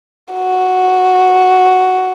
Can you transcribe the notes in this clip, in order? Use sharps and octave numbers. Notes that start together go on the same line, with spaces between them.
F#4